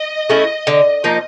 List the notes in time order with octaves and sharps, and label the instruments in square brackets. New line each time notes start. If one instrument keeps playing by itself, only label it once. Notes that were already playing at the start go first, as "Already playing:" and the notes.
Already playing: [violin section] D#5
[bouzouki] A3 C#4 E4
D3
F3 A#3 D#4